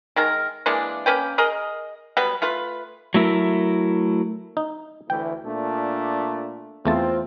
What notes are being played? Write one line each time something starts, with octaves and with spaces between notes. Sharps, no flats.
D#3 G#3 A#4
E3 G#3 A#3 D4
A#3 C#4 B4 G5
G#4 A#4 D#5
F#3 G3 B3 B4
A3 F4 B4
F#3 A3 E4 A#4
D#4
D2 E3 A3 G5
A#2 A3 D4
E2 A3 C4 F4 A5